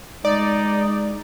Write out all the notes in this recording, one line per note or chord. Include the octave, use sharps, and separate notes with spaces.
G#3 D#4 D5